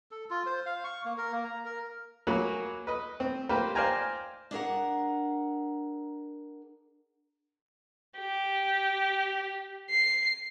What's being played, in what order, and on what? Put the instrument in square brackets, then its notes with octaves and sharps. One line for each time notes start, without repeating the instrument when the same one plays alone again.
[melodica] A4
F4
C5
F5
C#6
A#3
A#4
A#3
A#5
A#4
[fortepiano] F#3 A#3 F#4 G#4 B4
B4 D#5
C4
A#3 F4 G4 B4 C5
C5 D5 F5 G5 G#5 A#5
[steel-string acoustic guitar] D4 G#4 A#4 F#5
[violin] G4
C7